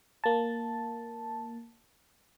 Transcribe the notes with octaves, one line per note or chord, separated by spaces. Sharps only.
A#3 A5